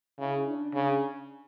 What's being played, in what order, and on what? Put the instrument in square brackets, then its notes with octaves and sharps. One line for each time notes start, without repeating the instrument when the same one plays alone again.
[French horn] C#3 [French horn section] E4
[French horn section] D4
[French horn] C#3